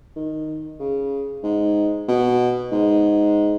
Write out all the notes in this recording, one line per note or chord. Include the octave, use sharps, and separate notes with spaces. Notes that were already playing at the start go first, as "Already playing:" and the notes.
D#3
C#3
G#2
B2
G#2